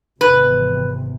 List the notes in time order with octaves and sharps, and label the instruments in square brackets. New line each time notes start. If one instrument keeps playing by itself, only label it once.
[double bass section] G#1 E2 C3 [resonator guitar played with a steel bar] B4